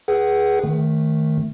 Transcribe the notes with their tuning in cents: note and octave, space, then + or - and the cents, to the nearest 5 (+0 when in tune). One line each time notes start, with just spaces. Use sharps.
G#4 +0 B4 -15 F#5 +25
D#3 +0 A3 +0